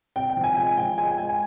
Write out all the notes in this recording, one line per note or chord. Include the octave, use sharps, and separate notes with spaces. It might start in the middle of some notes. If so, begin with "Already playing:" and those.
C3 G5
G5
F3
G#5
G#3 G#5
F3 G5
G#3 G#5
G5
G#3 G#5
G#5